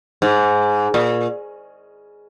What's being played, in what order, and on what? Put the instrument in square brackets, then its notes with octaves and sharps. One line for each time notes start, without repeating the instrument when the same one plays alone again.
[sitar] G#2
A#2